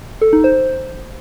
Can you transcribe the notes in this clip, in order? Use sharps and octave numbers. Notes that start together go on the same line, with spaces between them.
A4
D#4
C5